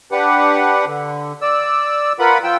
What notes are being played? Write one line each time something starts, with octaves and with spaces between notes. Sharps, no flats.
D4 G4 B4 F#5
D3
D5 E6
F4 A#4 B4 F#5 B5
F3 F4 G5 E6